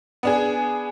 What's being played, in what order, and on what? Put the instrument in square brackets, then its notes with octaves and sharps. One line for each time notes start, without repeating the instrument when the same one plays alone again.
[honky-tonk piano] B3 D4 G#4